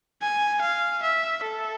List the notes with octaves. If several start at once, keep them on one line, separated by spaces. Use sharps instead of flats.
G#5
F5
E5
A4